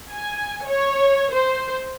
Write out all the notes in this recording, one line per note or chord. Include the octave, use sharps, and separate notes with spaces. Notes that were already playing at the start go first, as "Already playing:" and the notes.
G#5
C#5
C5